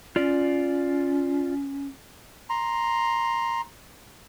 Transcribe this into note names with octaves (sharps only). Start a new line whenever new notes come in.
C#4 F4 D5
A#5 C6